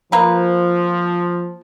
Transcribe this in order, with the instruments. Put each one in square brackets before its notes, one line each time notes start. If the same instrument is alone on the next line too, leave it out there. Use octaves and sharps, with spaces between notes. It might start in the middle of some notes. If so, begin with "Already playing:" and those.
[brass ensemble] F3 [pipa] A#3 B4